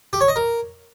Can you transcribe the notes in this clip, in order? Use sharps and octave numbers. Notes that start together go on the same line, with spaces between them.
G4
C#5
D#5
A#4